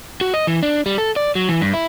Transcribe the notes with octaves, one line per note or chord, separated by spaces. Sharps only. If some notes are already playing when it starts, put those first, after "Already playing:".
F#4
D#5
E3
D4
G3
A4
D5
F#3
E3
G2
E4